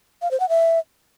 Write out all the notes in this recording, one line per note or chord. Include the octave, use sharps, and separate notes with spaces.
F5
C5
F#5
E5